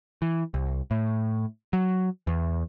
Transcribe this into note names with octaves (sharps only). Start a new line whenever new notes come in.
E3
C2
A2
F#3
E2